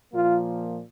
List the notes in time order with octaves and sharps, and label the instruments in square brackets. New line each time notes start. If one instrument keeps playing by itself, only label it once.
[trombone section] A#2 F3 A#3 F4